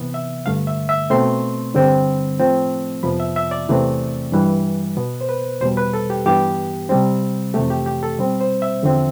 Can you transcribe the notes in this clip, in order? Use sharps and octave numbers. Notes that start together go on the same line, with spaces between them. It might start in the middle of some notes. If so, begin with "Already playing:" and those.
Already playing: C3 E3 B3
E5
G2 D3 A3 F5
E5
E5
B2 A3 C4 C6
G2 D3 G3 C4
A2 F3 A3 C4
F2 C3 F3 B3 B5
E5
E5
D5
E2 C3 E3 A3 C4
G2 E3 G3
B2 B3
C5
B4
E2 B2 G3 C5
B4
A4
G4
G2 E3 B3 G4
C3 G3 C4
F2 C3 E3 A3 G4
G4
G4
A4
B2 G3 C4
C5
E5
E2 D3 F3 C4